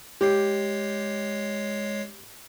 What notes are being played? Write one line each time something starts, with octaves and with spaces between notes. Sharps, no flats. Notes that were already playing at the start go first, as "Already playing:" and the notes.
G#3 G4 C#5 C7